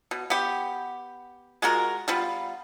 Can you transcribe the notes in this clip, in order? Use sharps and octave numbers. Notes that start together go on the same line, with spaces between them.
B2
B3 G4
G#3 F4 F#4 A#4
G3 B3 F4